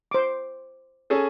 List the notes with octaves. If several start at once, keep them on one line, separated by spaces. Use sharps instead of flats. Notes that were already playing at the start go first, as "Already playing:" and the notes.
C5 D6
C#4 G#4 A4